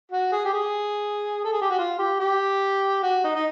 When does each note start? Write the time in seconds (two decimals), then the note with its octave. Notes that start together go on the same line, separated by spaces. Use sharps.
0.11 F#4
0.32 G#4
0.45 G4
0.54 G#4
1.44 A4
1.53 G#4
1.61 G4
1.70 F#4
1.78 F4
1.99 G4
2.20 G4
3.03 F#4
3.24 D#4
3.35 D#4